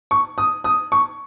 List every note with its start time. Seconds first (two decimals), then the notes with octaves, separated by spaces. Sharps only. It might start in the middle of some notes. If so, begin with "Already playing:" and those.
0.11 C#6
0.38 D#6
0.64 D#6
0.92 C#6